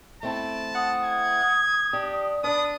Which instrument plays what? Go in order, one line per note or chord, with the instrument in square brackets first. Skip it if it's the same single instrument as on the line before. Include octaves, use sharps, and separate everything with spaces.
[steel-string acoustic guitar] A3 C4 E4 [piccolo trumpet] A5
[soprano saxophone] F#5 [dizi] D#6
[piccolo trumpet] G#6
[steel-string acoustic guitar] D4 [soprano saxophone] G4
[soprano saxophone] D4 [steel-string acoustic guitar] B4 D5 [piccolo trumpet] D#6